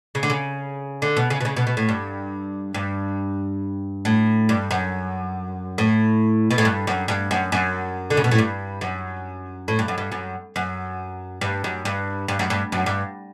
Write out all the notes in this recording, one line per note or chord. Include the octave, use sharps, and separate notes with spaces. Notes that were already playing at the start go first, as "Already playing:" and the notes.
C#3
D3
C#3
D3
B2
C#3
B2
C#3
B2
B2
A2
G2
G2
A2
G2
F#2
A2
B2
A2
G2
F#2
G2
F#2
F#2
D3
C#3
B2
A2
G2
F#2
A2
G2
F#2
G2
F#2
F#2
G2
F#2
G2
G2
F#2
G2
F#2
G2